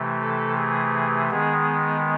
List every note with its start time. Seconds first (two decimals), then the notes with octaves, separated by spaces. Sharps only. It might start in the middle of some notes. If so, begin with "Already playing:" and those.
Already playing: C3 E3 A3
0.21 A4
0.57 G#4
1.30 D#3 G#3 B3 G#4